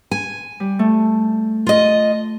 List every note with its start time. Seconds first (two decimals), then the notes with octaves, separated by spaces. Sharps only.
0.11 G#5
0.60 G3
0.79 A3
1.67 F4 D#5